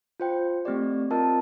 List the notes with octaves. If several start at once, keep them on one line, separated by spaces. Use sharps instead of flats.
F4 C5 G5
A3 C4 G4 D5
C4 F4 A#4 D#5 A5